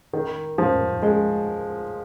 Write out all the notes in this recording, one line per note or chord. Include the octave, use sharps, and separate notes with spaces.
D#3
F3
G#3